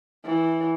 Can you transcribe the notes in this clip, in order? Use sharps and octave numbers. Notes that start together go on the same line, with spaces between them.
E3